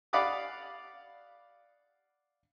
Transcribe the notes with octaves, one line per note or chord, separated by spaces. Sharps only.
D5 F5 F#5 B5 D6 D#6